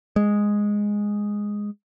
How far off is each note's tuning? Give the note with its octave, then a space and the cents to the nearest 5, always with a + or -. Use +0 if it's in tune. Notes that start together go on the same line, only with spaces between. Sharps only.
G#3 -5